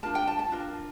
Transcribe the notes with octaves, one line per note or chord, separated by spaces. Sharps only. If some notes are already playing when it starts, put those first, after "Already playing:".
D4 F4 A#4 A5
G5
A5
A5
D4 F4 A#4